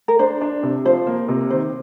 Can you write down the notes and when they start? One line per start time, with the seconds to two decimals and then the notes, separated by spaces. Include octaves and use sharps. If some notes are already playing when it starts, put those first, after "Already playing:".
0.08 A#4
0.19 D4 C5
0.41 D4
0.63 C3
0.85 F3 C5
1.07 A#3
1.28 C3
1.50 D#3 C5